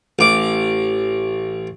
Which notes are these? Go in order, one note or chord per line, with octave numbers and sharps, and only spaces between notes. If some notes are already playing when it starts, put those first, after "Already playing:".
A1 D6